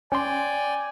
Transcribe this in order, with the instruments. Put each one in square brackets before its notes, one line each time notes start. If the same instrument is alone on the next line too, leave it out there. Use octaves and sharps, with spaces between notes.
[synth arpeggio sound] C#4 C6 [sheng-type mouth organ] D5 G5 [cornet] G#5